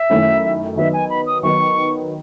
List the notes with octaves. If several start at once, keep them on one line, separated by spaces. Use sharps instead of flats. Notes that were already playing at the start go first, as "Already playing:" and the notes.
Already playing: E5
F#2 D#3 A3 C#4 E4
D#3 F#3 B3 D#4 E5
G#5
B5
D#6
D#3 F#3 B3 D#4 C#6